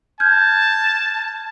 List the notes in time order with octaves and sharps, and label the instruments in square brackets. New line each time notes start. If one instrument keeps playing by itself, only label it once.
[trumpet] A5 [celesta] F6 G6 G#6